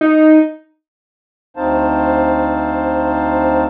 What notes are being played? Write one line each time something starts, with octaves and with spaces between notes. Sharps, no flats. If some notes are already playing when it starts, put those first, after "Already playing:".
D#4
D2 C4 D#4 C5 F5 A5